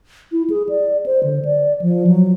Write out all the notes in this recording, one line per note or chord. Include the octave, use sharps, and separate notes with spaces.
E4
G#4
D5
C5
D3
D5
F3
F#3